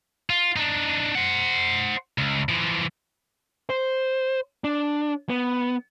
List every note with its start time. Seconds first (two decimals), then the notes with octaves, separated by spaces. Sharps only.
0.30 F4
0.56 D4 D#4
1.15 C5 F#5
2.18 C#2
2.49 E3 F3
3.69 C5
4.64 D4
5.29 B3